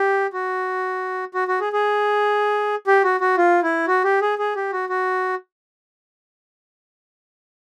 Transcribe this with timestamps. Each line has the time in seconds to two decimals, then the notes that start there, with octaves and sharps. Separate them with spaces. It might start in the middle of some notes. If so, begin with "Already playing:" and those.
Already playing: G4
0.33 F#4
1.34 F#4
1.48 F#4
1.60 G#4
1.73 G#4
2.87 G4
3.04 F#4
3.20 F#4
3.37 F4
3.63 E4
3.87 F#4
4.04 G4
4.22 G#4
4.39 G#4
4.56 G4
4.72 F#4
4.89 F#4